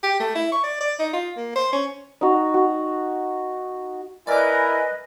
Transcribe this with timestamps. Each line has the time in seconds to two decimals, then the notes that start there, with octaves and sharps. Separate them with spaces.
0.03 G4
0.20 A3
0.35 E4
0.52 C#6
0.64 D5
0.81 D5
0.99 D#4
1.13 F4
1.37 A#3
1.56 C5
1.73 C#4
2.21 D#4 F#4
2.54 F#4
4.27 E4 A#4 B4 D5 D#5 G#5 D6